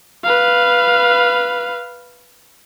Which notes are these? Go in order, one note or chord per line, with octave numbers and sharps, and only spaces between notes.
B4 F5